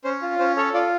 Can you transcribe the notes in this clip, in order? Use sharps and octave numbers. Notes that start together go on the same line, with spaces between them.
C#4 C5
F4
C#4 C5
A4 C#5
F4 D5